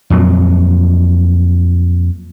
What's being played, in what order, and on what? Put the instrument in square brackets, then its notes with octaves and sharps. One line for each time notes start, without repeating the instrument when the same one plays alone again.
[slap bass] F2 A#2 F#3